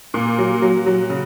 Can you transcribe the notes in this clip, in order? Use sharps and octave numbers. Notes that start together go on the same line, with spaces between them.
A#2
F#3
F#3
F#3
C#3